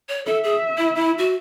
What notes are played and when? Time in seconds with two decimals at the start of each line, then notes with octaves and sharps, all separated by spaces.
0.09 C#5
0.26 A4 E5
0.44 G#4
0.78 E4
0.95 E4
1.18 F#4